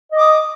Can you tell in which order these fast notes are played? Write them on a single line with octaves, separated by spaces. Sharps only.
D#5 D6 D#6